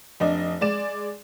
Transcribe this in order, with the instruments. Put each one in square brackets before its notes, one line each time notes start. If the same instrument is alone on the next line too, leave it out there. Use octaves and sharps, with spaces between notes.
[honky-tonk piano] F1 D4 D#5
G#3 D5 E7